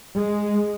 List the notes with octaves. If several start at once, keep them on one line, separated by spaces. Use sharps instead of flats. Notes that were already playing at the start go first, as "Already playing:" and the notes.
G#3